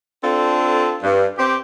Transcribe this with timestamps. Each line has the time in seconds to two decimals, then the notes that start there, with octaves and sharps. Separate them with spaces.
0.24 C4 D4 F4 A4
1.03 G2
1.38 C4 G4